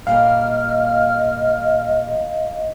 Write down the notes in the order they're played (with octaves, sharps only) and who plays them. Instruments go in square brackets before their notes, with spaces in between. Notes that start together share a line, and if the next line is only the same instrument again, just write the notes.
[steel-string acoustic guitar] A#2 G3 A#3 [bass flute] D#5 [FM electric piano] F5 [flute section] F6